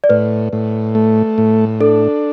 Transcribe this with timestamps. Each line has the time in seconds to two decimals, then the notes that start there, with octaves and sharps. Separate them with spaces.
0.04 D5
0.09 A2 B4
0.53 A2
0.95 A3
1.38 A2
1.80 D4 A4